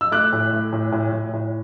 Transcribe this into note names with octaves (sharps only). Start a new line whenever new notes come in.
E6
A3 D6 F#6
A2
A3
A2
A2
A2
A2